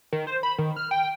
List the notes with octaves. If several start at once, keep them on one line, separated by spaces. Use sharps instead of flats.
D#3
C5
B5
D#3
F6
G5